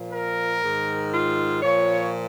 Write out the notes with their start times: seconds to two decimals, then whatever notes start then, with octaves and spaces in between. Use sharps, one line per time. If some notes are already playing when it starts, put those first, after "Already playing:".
Already playing: A#2 F3
0.12 A#4
0.62 G#2 D#3
1.12 F4
1.62 A#2 F3 C#5